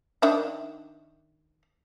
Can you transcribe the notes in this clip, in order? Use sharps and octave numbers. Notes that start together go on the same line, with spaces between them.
D#3 D4 E5